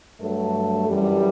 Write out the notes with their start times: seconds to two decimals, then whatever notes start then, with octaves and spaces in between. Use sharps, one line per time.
0.21 G2 F#3 A3 A4
0.88 F#2 E3 G3